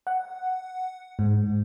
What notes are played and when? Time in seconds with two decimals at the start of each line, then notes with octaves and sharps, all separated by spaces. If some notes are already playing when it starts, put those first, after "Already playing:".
0.07 F#5
1.19 G#2